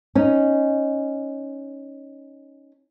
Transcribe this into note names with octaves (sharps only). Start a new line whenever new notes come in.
C#4 D#4